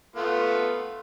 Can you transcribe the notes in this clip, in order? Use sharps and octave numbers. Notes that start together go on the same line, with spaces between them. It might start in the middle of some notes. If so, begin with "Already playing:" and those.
A3 B3 F4